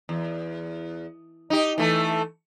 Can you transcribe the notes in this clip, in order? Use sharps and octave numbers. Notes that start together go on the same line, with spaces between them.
E2
D#4 G4
E3 A3